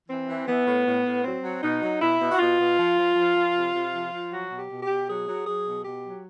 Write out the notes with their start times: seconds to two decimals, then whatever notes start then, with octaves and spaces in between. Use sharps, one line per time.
0.09 E3 C4
0.28 E3
0.46 E3 B3
0.66 A2
0.86 A2
1.05 A2
1.24 F#3 C4
1.43 F#3
1.62 B2 D#4
1.82 F#3
2.01 B2 E4
2.20 B2
2.31 F#4
2.39 B2 F4
2.58 B2
2.78 F3
2.97 F3
3.16 F3
3.36 F3
3.55 C3
3.74 C3
3.92 F3
4.12 F3
4.31 F#3 F#4
4.51 B2
4.57 G4
4.70 B2
4.83 G4
4.89 B2
5.08 F#3 G#4
5.28 F#3
5.47 F#3 G#4
5.66 B2
5.85 B2 G4
6.05 F#3